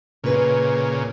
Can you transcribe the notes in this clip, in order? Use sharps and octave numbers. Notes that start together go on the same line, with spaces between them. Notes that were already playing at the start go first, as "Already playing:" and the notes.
A#2 C#3 C#4 B4